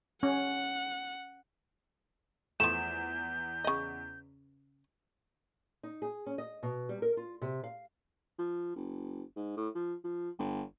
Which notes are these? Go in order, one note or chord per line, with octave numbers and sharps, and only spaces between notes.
C#4 F#5
E2 F3 A3 G6 E7
C#3 D#5
D#4
G#4
C#4
D#5
B2
G3
A#4
F4
C3
F5
F3
F#1
G#2
A2
F3
F3
G1